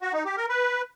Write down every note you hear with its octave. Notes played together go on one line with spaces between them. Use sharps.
F#4
D#4
G4
A#4
B4